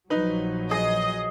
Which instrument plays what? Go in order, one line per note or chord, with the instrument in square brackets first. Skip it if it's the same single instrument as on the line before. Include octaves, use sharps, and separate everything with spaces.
[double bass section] A#1 F3 F#3 [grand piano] D#4 B4
[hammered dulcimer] G#4 [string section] D#5